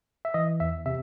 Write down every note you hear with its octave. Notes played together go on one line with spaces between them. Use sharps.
E5
E3 D#5
E2 E5
C3 E5